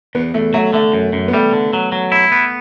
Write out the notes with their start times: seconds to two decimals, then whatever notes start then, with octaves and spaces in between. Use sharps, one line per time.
0.15 E2 B3
0.34 E2 A3
0.54 F#3 A3
0.73 D3 A3
0.94 F#2
1.13 F#2
1.28 B3
1.34 G3 A3
1.53 D3
1.73 F#3
1.92 F#3
2.12 E4
2.32 B3